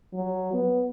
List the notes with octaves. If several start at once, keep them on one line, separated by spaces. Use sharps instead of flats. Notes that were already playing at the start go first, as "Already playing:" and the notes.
F#3
B3